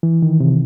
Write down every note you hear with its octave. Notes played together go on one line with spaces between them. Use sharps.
E3
D#3
C3